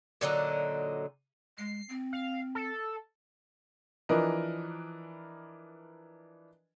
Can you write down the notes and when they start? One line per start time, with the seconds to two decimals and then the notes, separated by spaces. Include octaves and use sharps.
0.21 A#2 D3 F#3 D#4
1.58 G#3 C7
1.89 C4
2.13 F5
2.55 A4
4.09 E3 F3 D4 A#4 B4 D#5